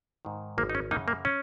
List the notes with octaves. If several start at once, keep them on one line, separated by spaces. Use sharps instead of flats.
G#2 D#3
G#1 A#3
D#4
C#4
F#2 C#3 A#3 D#4
A#3
C#4